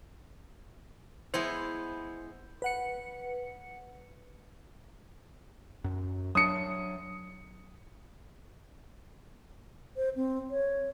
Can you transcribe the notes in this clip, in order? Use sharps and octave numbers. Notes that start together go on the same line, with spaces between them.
G#3 B3 E4 C5
B4 F#5 C#7
F#2
F#3 D4 D#6 C#7
C5
C4
C#5